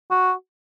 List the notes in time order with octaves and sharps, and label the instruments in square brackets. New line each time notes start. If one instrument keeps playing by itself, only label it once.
[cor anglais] F#4